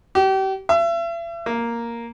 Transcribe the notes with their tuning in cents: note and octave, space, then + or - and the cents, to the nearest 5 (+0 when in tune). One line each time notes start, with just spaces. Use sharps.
G4 -35
E5 +40
A#3 +0